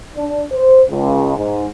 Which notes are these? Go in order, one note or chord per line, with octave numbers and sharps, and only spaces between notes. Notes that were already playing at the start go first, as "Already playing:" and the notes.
D4
C5
C#2
G#2